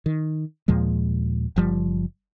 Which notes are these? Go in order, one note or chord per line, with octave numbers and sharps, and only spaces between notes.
D#3
D#2 A#2 F3 G#3
F#1 F3 G3